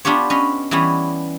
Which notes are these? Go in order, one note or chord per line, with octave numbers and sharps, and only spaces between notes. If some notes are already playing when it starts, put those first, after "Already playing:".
B3 D4 F4 G4 C#5
C#4 B4 D#5
E3 G3 B3 C#4